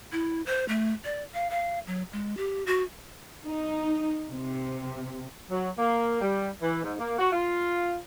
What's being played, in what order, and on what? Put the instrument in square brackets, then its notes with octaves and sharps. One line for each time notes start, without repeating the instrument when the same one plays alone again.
[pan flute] E4
C5
A3
D5
F5
F5
F#3
G#3
G4
F#4
[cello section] D#4
C3
[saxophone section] F#3
A#3
G3
E3
G#2
A#3
F#4
F4